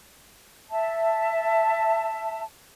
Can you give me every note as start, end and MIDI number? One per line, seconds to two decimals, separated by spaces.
0.70 2.42 76
0.70 2.42 81